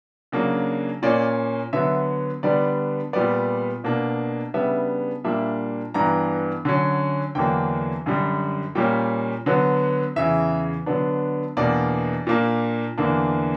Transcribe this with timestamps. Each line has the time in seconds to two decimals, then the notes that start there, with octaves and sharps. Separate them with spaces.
0.32 C#3 F#3 A#3 D4
1.02 A#2 A#3 C#4 D5
1.73 D3 F#3 B3 E5
2.43 D3 G3 B3 D4 D5
3.13 A#2 G3 B3 D5
3.84 B2 A#3 D4
4.54 C#3 G3 B3 D4 E5
5.24 A#2 G3 A#3 D4 E5
5.94 G2 E3 B3 D4 A#5
6.65 D3 F#3 C#4
7.35 E2 D3 F#3 A#3 D4 G5
8.06 F#2 D3 G3
8.75 A#2 G3 A#3 C#4 G5
9.46 D3 F#3 B3
10.16 E2 C#3 E3 E5
10.86 D3 F#3 B3 D4
11.57 E2 B2 A#3 D4 D5
12.27 A#2 A#3 D4
12.98 E2 D3 A#3 D4